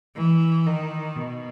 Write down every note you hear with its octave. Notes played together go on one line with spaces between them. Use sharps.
E3
D#3
B2